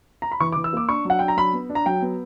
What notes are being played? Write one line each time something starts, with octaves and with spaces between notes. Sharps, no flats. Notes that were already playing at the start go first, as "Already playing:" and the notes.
A#5
B5
E3 C#6
D6
E3
E6
A#3 D6
D4 C#6
F#3 F#5
D4 G5
A#5
F#3 B5
B3
D4
A#5
F#3 G5
B3